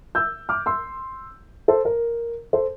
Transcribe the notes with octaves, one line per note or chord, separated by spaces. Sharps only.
E6 G6
D6 F6
C6 E6
A4 C5
A#4
A4 C5